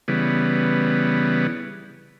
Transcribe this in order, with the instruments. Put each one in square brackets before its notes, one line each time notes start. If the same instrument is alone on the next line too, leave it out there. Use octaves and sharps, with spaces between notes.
[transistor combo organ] C#3 E3 G3 B3